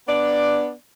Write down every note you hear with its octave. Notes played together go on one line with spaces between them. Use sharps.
B3 D4 D5